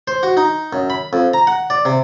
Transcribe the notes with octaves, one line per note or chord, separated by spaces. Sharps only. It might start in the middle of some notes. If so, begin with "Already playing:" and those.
C5
F#4
D#4
F#2
B5
F2
A#5
F#5
D5
C3